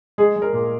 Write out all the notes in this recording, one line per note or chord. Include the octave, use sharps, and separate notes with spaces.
G#3 G#4
G#3
A#4
A#2